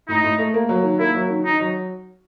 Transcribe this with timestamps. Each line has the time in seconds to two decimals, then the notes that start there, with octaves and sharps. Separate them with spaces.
0.08 A2 D#4
0.23 A2
0.39 A3
0.54 A#3
0.69 F#3
0.84 D#3
0.99 A#3 E4
1.14 F#3
1.30 D#3
1.45 D#3 D#4
1.60 F#3